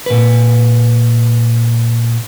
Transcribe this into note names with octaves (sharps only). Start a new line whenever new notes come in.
A#2 B4